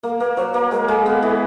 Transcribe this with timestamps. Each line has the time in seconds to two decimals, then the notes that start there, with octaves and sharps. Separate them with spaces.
0.03 A#3 A#4
0.20 A#3 B4
0.37 F#3 C5
0.54 A#3 B4
0.71 G#3 A#4
0.88 G#3 A4
1.06 B3 A4
1.22 E3 A4